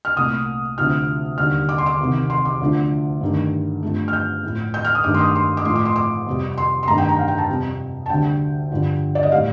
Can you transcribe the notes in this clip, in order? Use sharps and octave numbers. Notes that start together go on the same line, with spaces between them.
F6
C2 A#2 A3 D#6
D2 C3 F3 A3 F6
D#2 D3 G3 F6
D6
C6
D6
C2 C3 D#3
C6
D6
D2 D3 F3 A3
G2 D#3 A3
G2 F3 A3
F6
G6
A2 F3 A3
G6
F6
D#6
G2 D#3 A3 D6
C6
D#6
D6
C6
D6
A2 F3 A3 C6
D6
C6
D6
F2 C3 G3
C6
C6
G2 D#3 A3 A#5
G5
A#5
F5
G5
A5
F2 C3 G3
A5
D2 D3 G3 G5
G2 D3 F3
D5
D#5
A2 G3 F5